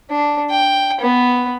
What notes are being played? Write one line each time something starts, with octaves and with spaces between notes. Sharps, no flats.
D4
G5
B3